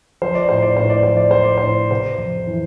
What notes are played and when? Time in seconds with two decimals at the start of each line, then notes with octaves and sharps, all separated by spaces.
0.22 F3 C5
0.35 D5
0.49 A2 C5
0.63 D5
0.77 A2 C5
0.90 D5
1.03 F3 C5
1.17 D5
1.31 F3 C5
1.44 D5
1.58 A2 C5
1.91 C3 C5
2.19 F2
2.47 E3